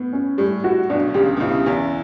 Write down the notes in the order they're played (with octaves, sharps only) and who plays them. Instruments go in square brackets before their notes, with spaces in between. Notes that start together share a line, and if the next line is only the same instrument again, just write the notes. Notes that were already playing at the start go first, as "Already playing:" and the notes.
Already playing: [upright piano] A2 [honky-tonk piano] B3
[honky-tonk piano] C#4
[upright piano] A2 [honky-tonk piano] G3
[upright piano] A2 [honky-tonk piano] F#4
[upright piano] B1 B2 [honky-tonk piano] D4
[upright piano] D3
[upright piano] C#2 C#3 [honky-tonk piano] G4
[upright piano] B2
[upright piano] C#2 C#3 [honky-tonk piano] E4
[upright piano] E2 E3 [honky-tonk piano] C#4